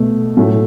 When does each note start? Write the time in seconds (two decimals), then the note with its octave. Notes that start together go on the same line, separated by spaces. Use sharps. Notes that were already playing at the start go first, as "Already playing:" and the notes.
Already playing: B2 A3
0.37 A2 F#3 A3